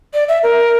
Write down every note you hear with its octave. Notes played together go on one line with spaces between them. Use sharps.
D5
E5
A#4